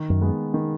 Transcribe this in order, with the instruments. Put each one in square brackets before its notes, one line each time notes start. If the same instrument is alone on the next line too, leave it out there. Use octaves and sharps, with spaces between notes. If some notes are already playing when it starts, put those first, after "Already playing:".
Already playing: [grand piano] D#3
[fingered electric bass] F#2
[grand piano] G#3 B3
D#3